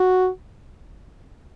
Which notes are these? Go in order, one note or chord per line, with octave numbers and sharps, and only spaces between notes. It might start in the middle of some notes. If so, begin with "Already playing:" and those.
Already playing: F#4